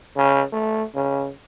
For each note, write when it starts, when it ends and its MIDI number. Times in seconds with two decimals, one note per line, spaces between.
0.17 0.42 49
0.52 0.83 57
0.95 1.28 49